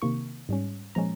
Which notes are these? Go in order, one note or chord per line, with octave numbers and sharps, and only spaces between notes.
C3 D#3 A#3 C#6
G#2 G3 C#4
A#2 F3 G#3 C#4 A#5